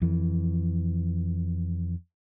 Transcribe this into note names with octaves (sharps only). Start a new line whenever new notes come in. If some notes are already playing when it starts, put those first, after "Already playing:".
F2 E3